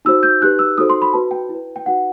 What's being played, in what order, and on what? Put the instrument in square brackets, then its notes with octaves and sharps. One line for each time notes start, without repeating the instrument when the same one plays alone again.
[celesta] D#4 F#4 C5 E6
G6
D#4 G4 B4 F#6
E6
D#4 F#4 A4 C5 D#6
C6
B5
F#4 B4 A5
G5
E4
B4
G5
D#4 F#4 B4 F#5